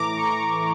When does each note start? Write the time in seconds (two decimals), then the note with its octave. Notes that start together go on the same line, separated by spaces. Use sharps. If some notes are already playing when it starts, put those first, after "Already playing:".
Already playing: A2 E3 A3 A#5 D6
0.16 C#6